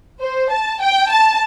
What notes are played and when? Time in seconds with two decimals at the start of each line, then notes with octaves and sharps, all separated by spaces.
0.22 C5
0.51 A5
0.81 G5
1.11 A5